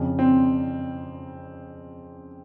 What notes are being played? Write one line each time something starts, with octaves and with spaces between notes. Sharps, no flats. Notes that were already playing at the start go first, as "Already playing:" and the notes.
Already playing: F2 C#3
C4